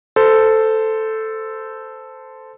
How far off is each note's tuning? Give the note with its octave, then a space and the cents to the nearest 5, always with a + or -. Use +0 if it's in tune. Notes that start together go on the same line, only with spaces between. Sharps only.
A4 +0 C5 -15